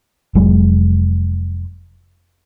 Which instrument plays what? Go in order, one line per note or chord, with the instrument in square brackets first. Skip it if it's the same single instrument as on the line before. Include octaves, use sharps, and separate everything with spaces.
[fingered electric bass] F1 F#3 G#3